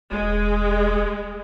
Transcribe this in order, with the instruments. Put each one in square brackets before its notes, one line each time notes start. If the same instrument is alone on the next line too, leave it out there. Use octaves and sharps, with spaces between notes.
[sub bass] E1 [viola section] G#3